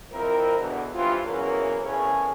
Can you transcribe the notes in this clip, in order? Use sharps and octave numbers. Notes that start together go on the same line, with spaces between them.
F2 C4 E4 A#4
E2 B2 D3
G2 E3 C4 F4
E2 E3 F#3 A#3 C#4
E2 A2 A#3 C#4 G#4 C#5